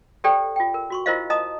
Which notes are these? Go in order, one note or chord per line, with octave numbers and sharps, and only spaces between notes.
G4 A4 C5 D5 G5
F4 G5
A#4
F#4 C6 C#6
E4 F4 A#4 C5 D#5 F5
D#5 A5 A#5 D#6